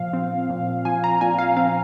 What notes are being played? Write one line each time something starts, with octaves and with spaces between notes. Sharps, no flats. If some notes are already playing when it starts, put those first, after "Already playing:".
Already playing: A#2 F3 F5
C4
A#2
F3 G#5
A#5
A#2 G#5
F5
C4 F5